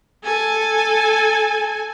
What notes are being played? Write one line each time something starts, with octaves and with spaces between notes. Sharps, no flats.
A4 G#5